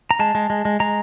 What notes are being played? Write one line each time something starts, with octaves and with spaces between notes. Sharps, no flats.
A#5
G#3 A5
G#3
G#3
G#3
G#3 A#5